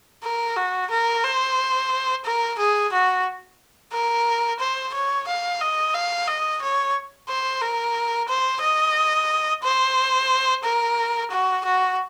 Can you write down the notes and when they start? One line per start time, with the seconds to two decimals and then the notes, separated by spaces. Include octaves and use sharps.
0.24 A#4
0.57 F#4
0.91 A#4
1.24 C5
2.25 A#4
2.59 G#4
2.93 F#4
3.93 A#4
4.60 C5
4.94 C#5
5.28 F5
5.61 D#5
5.94 F5
6.28 D#5
6.62 C#5
7.29 C5
7.62 A#4
8.29 C5
8.63 D#5
9.64 C5
10.64 A#4
11.31 F#4
11.65 F#4